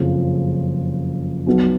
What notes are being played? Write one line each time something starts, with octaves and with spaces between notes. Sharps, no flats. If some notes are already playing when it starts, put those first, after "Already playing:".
Already playing: F#1 F2 C#3 F3
B1 B2 F#3